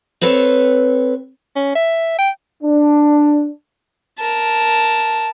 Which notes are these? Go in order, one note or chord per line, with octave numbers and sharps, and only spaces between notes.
C4 A4 B4 C#5
C#4
E5
G5
D4
A#4 A5